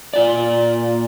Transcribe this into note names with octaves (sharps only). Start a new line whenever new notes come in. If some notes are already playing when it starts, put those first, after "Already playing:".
A#2 F4 D5